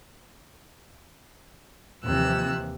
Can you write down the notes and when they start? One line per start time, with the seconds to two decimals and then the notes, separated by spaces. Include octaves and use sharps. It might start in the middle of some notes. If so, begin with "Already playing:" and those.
2.04 D#2 C3 E3 F3 E6 F#6